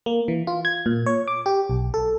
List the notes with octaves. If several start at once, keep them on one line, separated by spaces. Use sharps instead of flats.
A#3
E3
F4
G#6
A#2
C#5
D6
G4
B1
A4